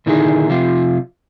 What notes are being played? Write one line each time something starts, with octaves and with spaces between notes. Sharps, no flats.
A#2 D3 D#3 D#4 E4 G#4
C3 F3 F4